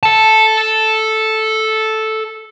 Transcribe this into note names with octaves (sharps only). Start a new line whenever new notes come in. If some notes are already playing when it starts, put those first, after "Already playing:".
A4 A5